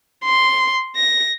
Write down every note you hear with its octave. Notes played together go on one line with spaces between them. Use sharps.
C6
A#6